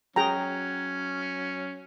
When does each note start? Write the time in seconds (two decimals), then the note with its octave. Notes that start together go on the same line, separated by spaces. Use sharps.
0.16 F#3 C#4 G#4 G5 A#5